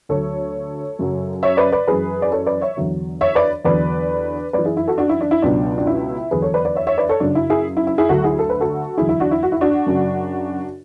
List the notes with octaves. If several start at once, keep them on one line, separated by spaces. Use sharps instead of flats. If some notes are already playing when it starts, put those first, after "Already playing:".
D2 D3 F#3 A4 C#5
F#2 C#3 F#3
C#5 E5
B4 D5
B4 D5
F#2 E3 G#4 B4
D5
A4 C#5
B4 D5
C#5 E5
E2 D3 F#3
C#5 E5
B4 D5
E2 D3 F#3 B4 D5
F#2 E3 B4 D5
E4 G#4
E4
F#4 A4
D4 F#4
E4
D4
E4
C#2 B2 F#3 D4
D4
E4
E2 D3 F#3 G#4 B4
A4 C#5
B4 D5
B4 D5
C#5 E5
C#5 E5
B4 D5
A4 C#5
F#2 C#3 F#3 D4
E4
E4 G#4
E4
E4
E4 G#4
D2 D3 F#3 F#4 A4
E4 G#4
A4
B4
F#4 A4
E2 D3 F#3 E4 G#4
E4
D4 F#4
E4
F#4
E4
D4 F#4
F#2 C#3 F#3